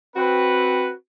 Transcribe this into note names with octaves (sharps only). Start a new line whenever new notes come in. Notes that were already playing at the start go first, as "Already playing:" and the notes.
C4 F#4 B4